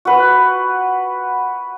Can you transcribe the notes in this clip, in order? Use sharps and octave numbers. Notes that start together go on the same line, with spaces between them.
F#4 B4